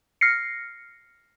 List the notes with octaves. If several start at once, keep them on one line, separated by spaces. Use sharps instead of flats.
F6 A#6 C7 C#7